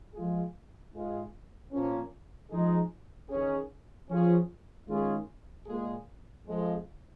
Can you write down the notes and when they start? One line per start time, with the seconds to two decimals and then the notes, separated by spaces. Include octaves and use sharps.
0.14 F3 G#3 F4 G#4
0.93 G#2 G#3 F4 G#4
1.72 A#2 F3 A#3 C#4
2.51 F3 G#3 D#4 G#4
3.29 D#3 C#4 G#4
4.09 F3 C#4 F4 G#4
4.88 D#3 G#3 C#4 F4 G#4
5.66 A#2 G#3 F4 G#4
6.46 F2 F3 G#3